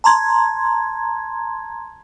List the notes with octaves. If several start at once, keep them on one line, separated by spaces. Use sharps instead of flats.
A5 A#5 C6 G#6